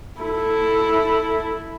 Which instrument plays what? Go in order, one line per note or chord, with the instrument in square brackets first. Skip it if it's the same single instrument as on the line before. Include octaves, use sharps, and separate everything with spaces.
[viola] E4 A4